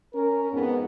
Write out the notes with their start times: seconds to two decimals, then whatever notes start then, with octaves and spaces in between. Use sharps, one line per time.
0.14 C#4 A#4
0.53 F2 G#2 B3